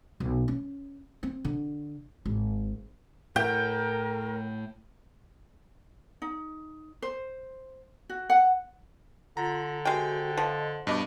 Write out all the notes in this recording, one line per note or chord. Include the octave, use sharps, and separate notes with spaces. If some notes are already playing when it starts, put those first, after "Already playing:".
B1
C#4
C4
D3
G#1
A2 A#4 G5
D#4
C5
F#4
F#5
D3 F4 A#5
C3 G#3 F#4 G5
F3 D#5
G2 B2 B3 D#5 D6